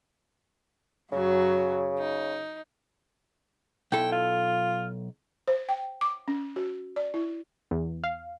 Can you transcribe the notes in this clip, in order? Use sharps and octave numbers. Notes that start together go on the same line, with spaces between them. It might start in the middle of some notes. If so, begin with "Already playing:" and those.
F#2 C#3 F#3
D#4
B1 E4 A4 G5
F4
C5
G5
D6
C#4
F#4
D5
E4
E2
F5